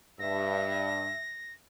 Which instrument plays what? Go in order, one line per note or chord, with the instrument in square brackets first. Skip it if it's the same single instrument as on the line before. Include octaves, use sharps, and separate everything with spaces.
[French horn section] G2 [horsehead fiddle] E5 [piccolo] A#6